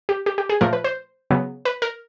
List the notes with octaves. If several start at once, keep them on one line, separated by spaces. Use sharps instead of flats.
G4
G4
G4
G#4
A#2 F3 A3 A#4
B4
C5
C#3 F#3 B3
B4
A#4